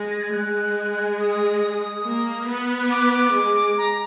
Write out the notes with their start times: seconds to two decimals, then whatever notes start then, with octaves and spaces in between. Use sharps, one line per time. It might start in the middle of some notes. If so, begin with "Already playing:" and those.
Already playing: G#3
0.10 A#6
0.23 G#6
0.33 G#3 F#6
1.19 D#6
2.05 A#3
2.48 B3
2.91 D6
3.13 D6
3.35 G#3
3.78 A#5